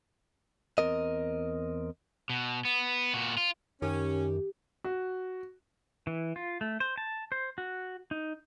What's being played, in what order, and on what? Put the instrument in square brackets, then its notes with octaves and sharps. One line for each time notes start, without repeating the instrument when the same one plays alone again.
[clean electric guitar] E2 C4 A#4 D#5
[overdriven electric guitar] B2
B3
A#2 F#4
F4
[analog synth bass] F#2 [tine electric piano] D#3 [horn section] C#4 [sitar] G4
[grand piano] F#4
[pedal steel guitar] E3
F4
A3
C5
A5
C5
F#4
D#4